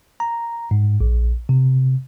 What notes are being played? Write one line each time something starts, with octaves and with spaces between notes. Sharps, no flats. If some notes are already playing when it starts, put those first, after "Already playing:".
A#5
G#2
A#1
C3